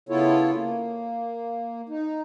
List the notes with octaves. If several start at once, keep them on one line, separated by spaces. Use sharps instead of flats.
C#3 B3 E4 F4 A4 C#5
A#3
D#4